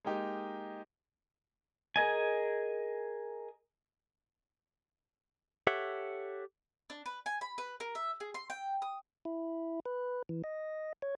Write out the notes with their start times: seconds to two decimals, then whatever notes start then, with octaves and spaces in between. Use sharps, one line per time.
0.05 G#3 A#3 D#4 G4
1.96 G#4 A#4 D#5 G#5
5.67 G4 A4 C#5 E5 F#5
6.90 D4
7.06 B4
7.26 G#5
7.41 B5
7.58 B4
7.80 A#4
7.95 E5
8.20 G#4
8.34 C6
8.50 G5
8.82 D#6
9.25 E4
9.86 B4
10.29 E3
10.44 D#5
11.02 C#5